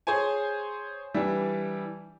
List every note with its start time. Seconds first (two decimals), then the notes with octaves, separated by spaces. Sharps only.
0.07 G#4 C5 C#5 G#5
1.14 E3 G3 D4 E4